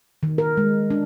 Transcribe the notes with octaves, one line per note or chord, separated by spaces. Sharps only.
D#3
A#4
G#3
D4